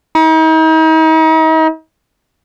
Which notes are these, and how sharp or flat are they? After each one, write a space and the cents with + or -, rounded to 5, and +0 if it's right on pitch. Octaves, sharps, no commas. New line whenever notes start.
D#4 +40